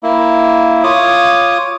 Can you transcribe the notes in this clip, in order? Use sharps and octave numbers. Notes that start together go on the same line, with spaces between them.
A#3 E4
F4 C#5 D6 D#6